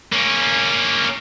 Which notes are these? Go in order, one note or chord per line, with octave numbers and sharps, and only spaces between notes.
A#3 C#4